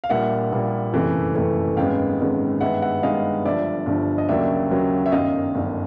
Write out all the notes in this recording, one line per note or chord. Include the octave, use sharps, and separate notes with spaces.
F5
A#1 A#2 G3 A#3 E5 F#5
A#1 A#2 G3 A#3
F#1 F2 C3 E3 A3
F#1 F2 C3 E3 A3
G#1 F#2 D#3 G#3 B3 F5 G5
G#1 F#2 D#3 G#3 B3
G2 D#3 G#3 B3 E5 F#5
E5 F#5
G2 D#3 G#3 B3 D#5 F5
G1 G2 D3 F3 D5 E5
G1 G2 D3 F3
D#5
D#2 C#3 F#3 A#3 D5 E5
D#2 C#3 F#3 A#3
E5
G1 F#2 D#3 D#5 F5
G1 F#2 D#3